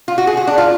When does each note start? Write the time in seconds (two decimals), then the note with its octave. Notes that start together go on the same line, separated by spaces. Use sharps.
0.08 F4
0.18 F#4
0.27 G#4
0.37 F#4
0.47 D4
0.58 F4